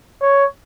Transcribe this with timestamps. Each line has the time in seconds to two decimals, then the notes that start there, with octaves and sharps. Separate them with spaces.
0.22 C#5